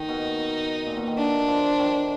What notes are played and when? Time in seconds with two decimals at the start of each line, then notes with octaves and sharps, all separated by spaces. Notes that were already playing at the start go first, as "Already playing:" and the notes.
Already playing: D#3 D#4
0.09 B2
0.86 A#2
0.97 B2
1.07 D#3
1.18 D4
1.48 F3
1.79 D#3